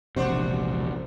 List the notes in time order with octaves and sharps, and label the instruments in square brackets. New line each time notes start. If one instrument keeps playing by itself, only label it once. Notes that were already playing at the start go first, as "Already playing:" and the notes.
[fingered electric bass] E1 A#1 C3 [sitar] D4 F#4 C5